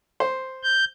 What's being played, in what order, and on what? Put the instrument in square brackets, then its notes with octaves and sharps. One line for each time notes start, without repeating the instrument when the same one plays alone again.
[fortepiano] C5
[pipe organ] G6